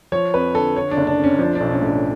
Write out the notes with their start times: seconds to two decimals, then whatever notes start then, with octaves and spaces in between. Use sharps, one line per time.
0.12 F3 C#5
0.34 F2 B4
0.55 D3 A4
0.76 D3 C#5
0.91 D4
0.97 F#1
1.07 D4
1.18 F2
1.24 C#4
1.39 F3 D4
1.55 D4
1.60 B1
1.71 C#4
1.81 A2
1.87 D4